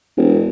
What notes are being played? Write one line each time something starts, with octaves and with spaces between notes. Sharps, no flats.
E1